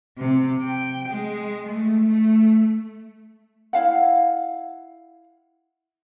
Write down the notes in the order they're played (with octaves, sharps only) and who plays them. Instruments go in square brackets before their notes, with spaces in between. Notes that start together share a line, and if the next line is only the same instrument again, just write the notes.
[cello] C3
G5
G#3
A3
A3
[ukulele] E4 F5 F#5